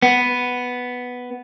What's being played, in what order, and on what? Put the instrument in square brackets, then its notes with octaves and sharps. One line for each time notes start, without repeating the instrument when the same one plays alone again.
[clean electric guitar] B3